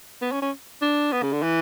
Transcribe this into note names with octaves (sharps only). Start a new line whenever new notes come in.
B3
C#4
C#4
D4
B3
C#3
D3
E3